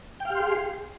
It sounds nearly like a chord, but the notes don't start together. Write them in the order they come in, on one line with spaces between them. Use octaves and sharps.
G5 F5 G4 C6 G#4